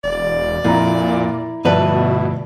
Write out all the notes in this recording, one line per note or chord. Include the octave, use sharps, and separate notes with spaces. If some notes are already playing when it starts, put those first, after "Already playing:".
E1 D5
F2 A#2 E4 A#5
D2 G2 B2 F3 E4 B4 D5 A5